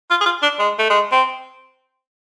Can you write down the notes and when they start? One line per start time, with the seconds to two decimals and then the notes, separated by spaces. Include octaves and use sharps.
0.10 F4
0.21 G#4
0.26 F4
0.42 D4
0.59 G#3
0.79 A3
0.90 G#3
1.12 C4